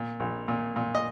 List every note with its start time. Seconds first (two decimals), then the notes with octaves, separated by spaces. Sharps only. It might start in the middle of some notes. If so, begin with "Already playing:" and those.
Already playing: A#2
0.20 A#1
0.48 A#2
0.76 A#2
0.95 D#5